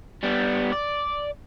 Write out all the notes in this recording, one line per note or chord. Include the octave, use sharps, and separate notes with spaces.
G3 B3
D5